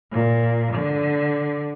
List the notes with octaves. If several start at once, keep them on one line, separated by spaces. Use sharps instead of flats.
A#2
D3